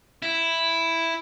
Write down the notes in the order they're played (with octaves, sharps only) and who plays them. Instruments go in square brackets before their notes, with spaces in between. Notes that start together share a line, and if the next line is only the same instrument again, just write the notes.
[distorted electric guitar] E4